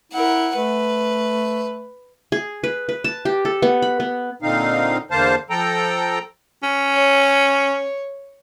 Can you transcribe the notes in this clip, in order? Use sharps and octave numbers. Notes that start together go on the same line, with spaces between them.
E4 A#4 F#5
A3 B4
G#4
B4
B4
A5
G4
A4
B3
B5
B3
A#2 D3 C4 D#4 F5
E2 D3 A#3 C5 F5 A5
F3 A4 G5 A#5
C#4
C#5